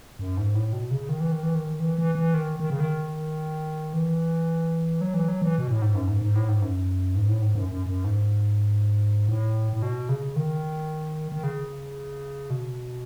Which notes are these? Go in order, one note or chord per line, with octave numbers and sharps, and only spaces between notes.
F#2
G#2
A2
B2
C#3
D#3
E3
D#3
E3
D#3
E3
E3
E3
D#3
D#3
C#3
D#3
E3
F#3
E3
F#3
E3
B2
A2
G#2
F#2
G#2
G#2
A2
G#2
F#2
G#2
A2
G#2
F#2
F#2
F#2
G#2
A2
A2
B2
C#3
D#3
D#3
C#3
B2